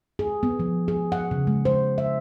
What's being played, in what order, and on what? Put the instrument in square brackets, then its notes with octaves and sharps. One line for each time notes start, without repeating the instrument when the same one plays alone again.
[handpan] G#4
B3
F3
G#4
F#5
C#3
G#3
C5
E5